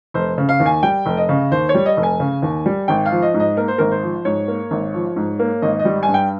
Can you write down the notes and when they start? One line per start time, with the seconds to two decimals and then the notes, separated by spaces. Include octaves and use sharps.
0.14 F1 C5
0.38 C#3
0.49 F5
0.60 D#2
0.66 G#5
0.83 G3 G5
1.06 F1
1.17 D#5
1.29 C#3
1.51 D#2 C5
1.69 C#5
1.74 G3
1.86 D#5
1.97 F1
2.03 G#5
2.20 C#3
2.42 D#2
2.66 G3
2.88 G#1 G5
3.06 F5
3.11 F3
3.22 D#5
3.34 G#2
3.40 D#5
3.57 A#3 A#4
3.68 C5
3.78 G#1 A#4
3.91 C5
4.03 F3
4.25 G#2 C#5
4.48 A#3
4.71 G#1
4.94 F3
5.16 G#2
5.39 A#3
5.62 G#1 D#5
5.79 D#5
5.85 G3
6.03 G#5
6.08 G2
6.14 G5